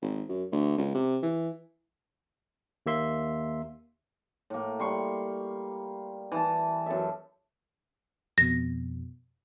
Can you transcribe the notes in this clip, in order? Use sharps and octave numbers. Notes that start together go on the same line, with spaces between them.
G#1
F#2
D2
C#2
C3
E3
D#2 A#3 E5 C6
A2 A#3
G3 C6 C#6
E3 A5
F#2 A4 E5
F2 B2 A#6